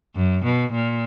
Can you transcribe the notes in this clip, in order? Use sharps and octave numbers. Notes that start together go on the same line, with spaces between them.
F#2
B2
A#2